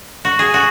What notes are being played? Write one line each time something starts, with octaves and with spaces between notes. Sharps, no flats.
F#4
G#4
F#4